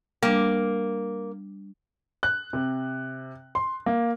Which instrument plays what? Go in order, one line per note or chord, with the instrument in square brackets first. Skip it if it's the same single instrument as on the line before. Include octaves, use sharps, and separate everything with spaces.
[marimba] G3 D4 [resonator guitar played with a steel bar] A#3
[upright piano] F#6
C3
C6
A#3